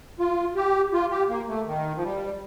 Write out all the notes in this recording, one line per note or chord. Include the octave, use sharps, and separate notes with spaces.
F4
G4
F4
G4
A#3
A3
D#3
F3
G3